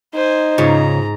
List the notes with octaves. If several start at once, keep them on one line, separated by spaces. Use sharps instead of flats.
D#4 C5 G#5
G#2 C#3 F4 C#5 A#5